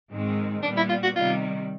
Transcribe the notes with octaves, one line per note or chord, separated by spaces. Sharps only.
G#2 D#3 G#3 C4
A#2 G3 B3 D4
E4
F4
F#4
C3 D#3 G3 F4